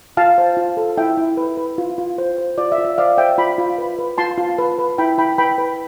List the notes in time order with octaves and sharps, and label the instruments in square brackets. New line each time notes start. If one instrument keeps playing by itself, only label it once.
[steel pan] F4 F5 A5
C5
F4
A4
E4 E5 G5
E4
B4
B4
F4
F4
C5
C5
F4 D5
E5
F4
E5
C5 D5 F5
C5 E5 G5
F4 G5 B5
F4
B4
B4
F4 A5 C6
F4
B4
B4
E4 G5 B5
E4 G5 B5
B4 G5 B5
B4